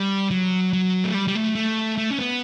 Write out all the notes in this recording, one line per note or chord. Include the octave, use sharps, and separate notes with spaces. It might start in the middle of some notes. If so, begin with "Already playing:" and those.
Already playing: G3
F#3
F#3
A3
G3
G3
A3
A3
A3
C#4
B3